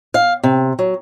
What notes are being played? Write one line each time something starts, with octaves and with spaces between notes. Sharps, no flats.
F5
C3
F#3